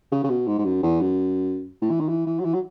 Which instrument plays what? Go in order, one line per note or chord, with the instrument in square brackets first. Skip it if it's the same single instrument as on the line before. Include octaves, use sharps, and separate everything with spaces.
[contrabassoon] C#3
C#3
B2
G#2
G#2
F#2
E2
F#2
A2
E3
D#3
E3
E3
F#3
E3
F#3